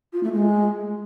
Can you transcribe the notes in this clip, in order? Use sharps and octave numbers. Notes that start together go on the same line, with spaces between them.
F4
A3
G#3